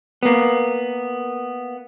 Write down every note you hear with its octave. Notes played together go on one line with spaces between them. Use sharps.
A#3 B3